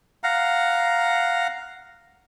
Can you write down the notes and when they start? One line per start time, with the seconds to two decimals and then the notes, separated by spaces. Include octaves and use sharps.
0.24 F5 F#5 A#5